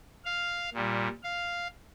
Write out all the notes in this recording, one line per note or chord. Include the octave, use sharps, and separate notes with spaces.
F5
A#2 G3
F5